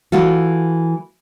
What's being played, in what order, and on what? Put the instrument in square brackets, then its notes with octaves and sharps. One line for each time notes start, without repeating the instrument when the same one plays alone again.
[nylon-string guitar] E3 A3 F4 F#4